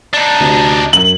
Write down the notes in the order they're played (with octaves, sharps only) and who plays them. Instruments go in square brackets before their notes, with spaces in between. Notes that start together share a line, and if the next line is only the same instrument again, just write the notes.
[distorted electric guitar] D4 D#4
[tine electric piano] D2 C3
[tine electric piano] F#2 [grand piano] F#7